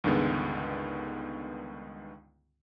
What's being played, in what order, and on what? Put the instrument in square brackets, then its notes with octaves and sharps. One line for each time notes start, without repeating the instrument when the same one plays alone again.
[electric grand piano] C#2 G2 D3 D#3 G#3 B3